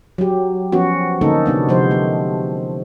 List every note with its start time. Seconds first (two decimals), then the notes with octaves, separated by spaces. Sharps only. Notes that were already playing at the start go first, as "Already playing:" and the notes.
0.18 F#3 G4
0.72 F3 B3 C#4 F#4
1.21 D3 A3 A#3 C#4 D#4 A4
1.46 C3 B3 D4
1.69 C3 F3 G#3 C5
1.91 A3